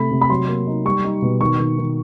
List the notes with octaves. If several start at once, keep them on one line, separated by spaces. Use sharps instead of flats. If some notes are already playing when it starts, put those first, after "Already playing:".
Already playing: C3 A3 B5
C3
B5
F#3 C6
A#3
D#4
G3 C#6
D#4
B2
D#3 C#6
D#3
D#3